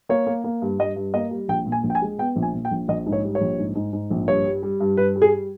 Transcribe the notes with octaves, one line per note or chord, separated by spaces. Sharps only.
A#3 C#5
A#3
A#3
G2
G2 D#5
G2
A#3 D#5
G3
A#1 G5
A#2
G#5
A#1
G5
G#5
G#3
B3 G5
A#1
G#5
A#2
G5
A#1
A#1 D#5
G#2
C#5
G3
C#5
A#1
G#2
G#2
G#2
A#1
G2 C#5
G3
G3
G2
G2 B4
G3
G#4